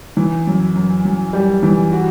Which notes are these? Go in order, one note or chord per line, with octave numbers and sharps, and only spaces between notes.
E3
F#2
F#2
F#2
G3
E3
F#4